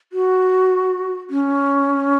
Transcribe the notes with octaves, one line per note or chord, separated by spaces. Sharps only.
F#4
C#4